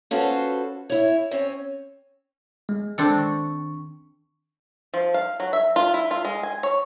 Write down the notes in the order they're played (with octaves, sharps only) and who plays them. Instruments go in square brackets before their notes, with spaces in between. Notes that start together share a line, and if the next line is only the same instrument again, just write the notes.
[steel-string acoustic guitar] C#4 F4 F#4 A4 B4 C5
E4 C#5
C4 C#4 C#5
[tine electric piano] G#3
[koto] C4 D4 A4
[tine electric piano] D#3 C#6
[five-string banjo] F3
F5
F#3
E5
F4
E4
F4
G#3
G#5
C#5